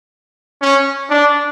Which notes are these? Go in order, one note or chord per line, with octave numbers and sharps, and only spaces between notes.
C#4
D4